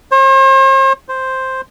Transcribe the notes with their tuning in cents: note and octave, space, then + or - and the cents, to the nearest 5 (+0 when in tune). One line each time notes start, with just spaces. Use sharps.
C5 +45
C5 +0